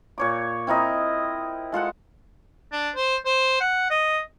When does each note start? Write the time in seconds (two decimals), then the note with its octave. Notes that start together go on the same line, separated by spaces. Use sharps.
0.18 A#2 C#5 D6
0.67 C4 E4 A#4 D#5
1.72 G#3 F4 A4 F#5
2.72 D4
2.96 C5
3.25 C5
3.60 F#5
3.90 D#5